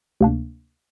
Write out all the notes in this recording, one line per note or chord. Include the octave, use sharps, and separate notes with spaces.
D2 C3 A#3 D4